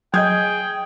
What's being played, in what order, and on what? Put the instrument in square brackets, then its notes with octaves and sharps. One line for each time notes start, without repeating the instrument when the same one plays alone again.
[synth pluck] F#3 [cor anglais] G#4 [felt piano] D#5 G6 G#6 [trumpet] G5